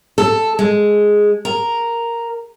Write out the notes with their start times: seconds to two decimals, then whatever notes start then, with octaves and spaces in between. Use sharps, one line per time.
0.18 A4
0.59 G#3
1.45 A#4